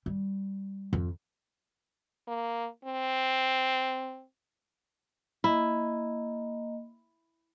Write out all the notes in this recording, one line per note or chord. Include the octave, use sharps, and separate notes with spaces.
G3
F2
A#3
C4
A#3 E4 D#5